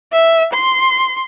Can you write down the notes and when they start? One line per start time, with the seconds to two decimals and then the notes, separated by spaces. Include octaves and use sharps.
0.12 E5
0.53 C6